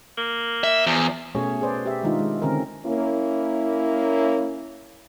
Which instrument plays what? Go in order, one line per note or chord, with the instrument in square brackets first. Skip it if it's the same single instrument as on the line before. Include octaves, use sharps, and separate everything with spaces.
[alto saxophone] A#3
[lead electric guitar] E5
[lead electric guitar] E2 [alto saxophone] F3
[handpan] B2 A3 C#4 G#4 C#5
G#4 B4 C5 D5
G4 E5
D#3 G#3 D4 D#4 F4
G#3
D3 D#3 C4 C#4 A#4
[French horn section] A#3 C#4 E4